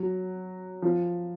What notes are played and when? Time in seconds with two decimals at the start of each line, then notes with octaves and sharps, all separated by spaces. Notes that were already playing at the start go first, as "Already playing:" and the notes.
Already playing: F#3
0.82 F3